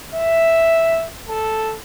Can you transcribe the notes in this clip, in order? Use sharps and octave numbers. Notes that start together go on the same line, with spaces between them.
E5
A4